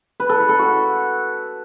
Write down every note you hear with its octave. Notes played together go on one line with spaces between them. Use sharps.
B4
A4
B4
A4
F#4